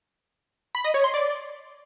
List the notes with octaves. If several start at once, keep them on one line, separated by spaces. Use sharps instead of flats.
B5
D#5
C#5
C6
D5